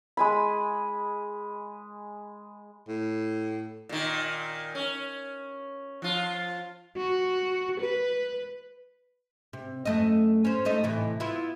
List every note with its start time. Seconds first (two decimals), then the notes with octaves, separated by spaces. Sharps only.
0.17 G#3 G#5 B5
2.88 A2
3.89 A#2 D#3
4.75 C#4
6.02 F3 F4
6.96 F#4
7.81 B4
9.53 C3
9.85 F#2 A3 D#5
10.45 C#4 C5
10.65 A3 D#4 D#5
10.84 A2 C3 E3
11.20 B3 E4 F4